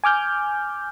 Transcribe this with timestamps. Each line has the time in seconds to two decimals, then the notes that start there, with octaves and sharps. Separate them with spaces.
0.04 G#5 D6 F6 G6